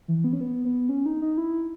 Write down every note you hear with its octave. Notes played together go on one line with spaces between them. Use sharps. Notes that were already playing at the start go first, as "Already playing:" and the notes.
E3
B3
C#4
B3
B3
C#4
D#4
D#4
E4